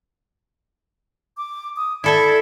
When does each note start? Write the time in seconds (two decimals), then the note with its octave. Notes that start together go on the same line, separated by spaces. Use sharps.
1.37 D6
1.76 D#6
2.04 E4 A4 D5 E5 B5 G#6